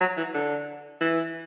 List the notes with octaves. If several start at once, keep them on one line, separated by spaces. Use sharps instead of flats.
F#3
E3
D3
E3